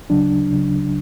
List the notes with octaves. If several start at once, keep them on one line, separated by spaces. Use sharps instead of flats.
D2 C#3 F#3 D4
D2 C#3 F#3